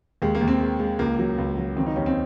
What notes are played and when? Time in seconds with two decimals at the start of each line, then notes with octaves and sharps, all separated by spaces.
0.22 D#2 G#3
0.35 A#3
0.41 D#2
0.48 C4
0.60 G#3
0.79 G#3
0.99 C#2 A#3
1.19 F#3
1.38 C#2
1.57 F#3
1.76 D#3 C4
1.87 D#4
1.96 D#2 C#4
2.06 C4